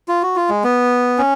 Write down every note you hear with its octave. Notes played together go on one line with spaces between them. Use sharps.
F4
F#4
F4
G#3
B3
C#4